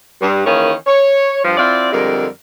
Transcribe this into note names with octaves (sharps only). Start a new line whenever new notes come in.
G2
D#3 E3 A#3 C#4 G#4
C#5
G2 F3
C4 E4 F4 D5
F2 D3 G3 G#3 A#4